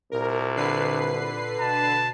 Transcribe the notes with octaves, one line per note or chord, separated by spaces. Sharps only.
C2 A#2 A#4
D3 B4 C7
B2 A5